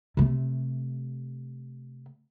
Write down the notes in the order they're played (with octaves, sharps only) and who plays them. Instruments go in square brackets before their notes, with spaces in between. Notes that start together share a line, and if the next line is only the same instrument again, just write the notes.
[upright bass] C3 A3